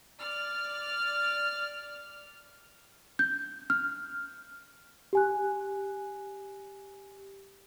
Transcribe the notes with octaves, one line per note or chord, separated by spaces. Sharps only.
D5 F6
G6
F6
G4 G#5 F#6